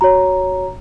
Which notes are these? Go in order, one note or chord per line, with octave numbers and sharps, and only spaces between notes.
F#4 C#5 A#5